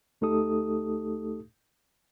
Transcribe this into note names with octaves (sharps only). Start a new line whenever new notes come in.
D2 A3 D#4 G4 A4 D#6